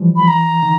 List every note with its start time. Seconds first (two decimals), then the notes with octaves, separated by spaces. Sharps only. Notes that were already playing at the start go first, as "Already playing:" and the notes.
Already playing: E3 F3 G3
0.16 B5
0.28 A#5
0.63 D#3